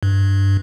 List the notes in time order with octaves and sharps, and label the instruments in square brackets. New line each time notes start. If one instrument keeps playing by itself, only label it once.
[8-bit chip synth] G2